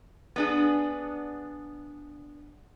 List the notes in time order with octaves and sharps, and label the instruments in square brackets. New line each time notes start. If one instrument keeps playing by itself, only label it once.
[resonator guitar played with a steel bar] B3 D4 G#4